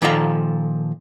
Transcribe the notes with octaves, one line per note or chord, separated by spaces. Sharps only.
A#2 D#3 F3 A4 F5 A#5